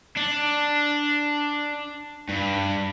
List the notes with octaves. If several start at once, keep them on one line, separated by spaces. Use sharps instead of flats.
D4
G2